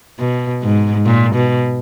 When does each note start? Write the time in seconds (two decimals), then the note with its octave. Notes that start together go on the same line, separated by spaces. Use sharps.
0.19 B2
0.63 G#2
1.06 A#2
1.35 B2